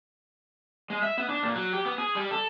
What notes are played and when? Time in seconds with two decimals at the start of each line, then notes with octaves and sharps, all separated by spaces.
0.90 G#3
1.03 E5
1.18 B3
1.29 D4
1.43 A#2
1.55 F#3
1.73 G4
1.85 B3
1.98 G#4
2.15 G3
2.31 A4